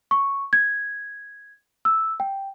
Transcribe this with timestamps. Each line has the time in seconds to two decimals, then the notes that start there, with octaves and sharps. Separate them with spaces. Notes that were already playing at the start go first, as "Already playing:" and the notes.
0.11 C#6
0.53 G#6
1.85 E6
2.20 G5